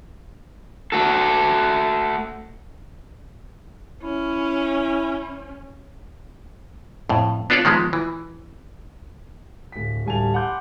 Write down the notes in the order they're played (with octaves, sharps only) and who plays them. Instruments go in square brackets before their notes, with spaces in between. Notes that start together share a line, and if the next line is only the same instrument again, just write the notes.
[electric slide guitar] A3 F#4 A4
[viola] C#4 [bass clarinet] E4
[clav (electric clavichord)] F2 A2
B3 D4 F4 A4 C#5 D5
D#3 F3 G#3 B3
E3
[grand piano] D1 B6
D1 G3 G#5 A5 F7
F#5 G#5 B5 C6 D6 G6